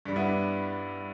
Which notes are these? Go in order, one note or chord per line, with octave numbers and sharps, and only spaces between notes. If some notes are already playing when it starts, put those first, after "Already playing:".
G2 G3
B3 E4
D4